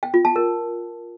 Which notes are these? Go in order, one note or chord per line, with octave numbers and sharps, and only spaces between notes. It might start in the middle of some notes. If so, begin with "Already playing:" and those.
G5
F4
A5
A#4